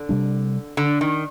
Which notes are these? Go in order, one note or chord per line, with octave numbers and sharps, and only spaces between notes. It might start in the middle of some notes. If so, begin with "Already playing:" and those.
Already playing: D3
C3 G3 D4
D3
D#3